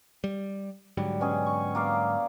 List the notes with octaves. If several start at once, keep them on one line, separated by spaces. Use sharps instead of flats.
G3
G#2 D3 F#3 G3
B2 C#4 G#4
C#6
A#3 D5 F5